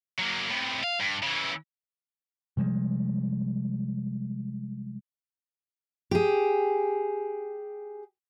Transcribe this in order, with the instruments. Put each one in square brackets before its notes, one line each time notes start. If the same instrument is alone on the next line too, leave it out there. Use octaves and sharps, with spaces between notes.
[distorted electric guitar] F#3 A#3
A2 C3
F5
G2
C#3 E3
[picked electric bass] C3 F3 G3 G#3
[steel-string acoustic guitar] G4 G#4